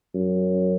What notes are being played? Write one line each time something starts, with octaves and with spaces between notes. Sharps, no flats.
F#2